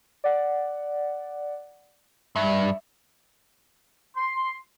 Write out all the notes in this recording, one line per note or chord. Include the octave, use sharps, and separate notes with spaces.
D5 F#5
G2 E5
C6